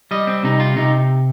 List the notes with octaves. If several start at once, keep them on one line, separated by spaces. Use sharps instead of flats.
G3 D#5
C4
C3 D#4
F4
C3 D#4